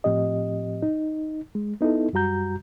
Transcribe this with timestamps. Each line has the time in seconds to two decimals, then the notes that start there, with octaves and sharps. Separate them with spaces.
0.04 A2 F3 C4 G4 D#5
0.83 D#4
1.55 G#3
1.81 B3 D#4 E4 A4
2.13 F#2 G3 F#4 A#5 G6